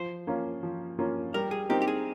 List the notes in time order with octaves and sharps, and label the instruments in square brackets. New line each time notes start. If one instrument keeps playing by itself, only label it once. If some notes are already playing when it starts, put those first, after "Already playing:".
Already playing: [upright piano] F3 [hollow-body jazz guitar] C5
[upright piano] A#3 C#4 F4
F3
A#3 C#4 F4
[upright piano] G3 [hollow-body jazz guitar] A#4
[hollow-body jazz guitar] G#4
[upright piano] C4 D#4 A#4 [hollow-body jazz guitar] G4
[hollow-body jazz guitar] G4
G#4